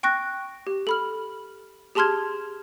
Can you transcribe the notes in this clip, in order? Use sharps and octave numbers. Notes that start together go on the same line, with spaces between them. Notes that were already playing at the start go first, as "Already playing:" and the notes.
G5 C#6 F#6 A#6
G4
A4 B5 F6
G4 G#4 A5 C6 F6 G#6